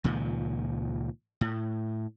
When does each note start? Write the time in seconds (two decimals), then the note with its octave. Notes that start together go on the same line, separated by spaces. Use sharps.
0.04 C#2 A#2 D#3 F3
1.41 A2